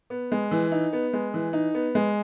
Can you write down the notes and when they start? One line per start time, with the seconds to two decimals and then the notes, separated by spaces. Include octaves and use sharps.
0.10 B3
0.32 G#3
0.51 E3
0.72 D#4
0.93 B3
1.13 G#3
1.34 E3
1.53 D#4
1.74 B3
1.95 G#3